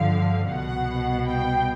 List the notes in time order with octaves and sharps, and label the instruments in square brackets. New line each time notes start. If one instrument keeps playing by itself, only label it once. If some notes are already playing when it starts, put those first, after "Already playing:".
Already playing: [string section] G2 D3 F3 F5
C2 B2 F#5
G5